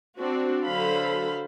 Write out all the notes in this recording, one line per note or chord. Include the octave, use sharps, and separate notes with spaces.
C4 D4 F#4
D3 F#3 A4 C5 F5 B5